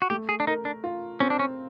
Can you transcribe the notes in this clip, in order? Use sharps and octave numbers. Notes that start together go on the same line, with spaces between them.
F#4
A3 G4
G#4
D4
D#4 A#4
D4
F4
C4 C#4
D4
C#4